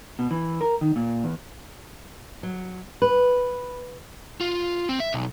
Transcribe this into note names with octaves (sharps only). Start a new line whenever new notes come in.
B2
E3
A#4
D#3
A#2
E2
F#3
B4
F4
C4
E5
B1